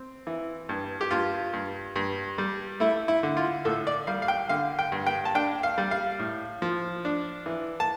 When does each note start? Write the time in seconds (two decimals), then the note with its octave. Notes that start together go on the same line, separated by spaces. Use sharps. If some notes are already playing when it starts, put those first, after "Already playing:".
Already playing: C4
0.27 E3
0.69 G2
1.01 G4
1.11 G2 F4
1.53 G2
1.96 G2
2.38 G3
2.80 A3 E4
3.08 E4
3.23 D3
3.37 F4
3.65 A2 A4
3.87 D5
4.07 G3 F5
4.22 F5
4.28 G5
4.49 D3 F5
4.79 G5
4.92 G2
5.07 G5
5.25 A5
5.35 D4 G5
5.63 F5
5.78 G3
5.91 F5
6.19 A2
6.62 F3
7.05 D4
7.46 E3
7.80 A5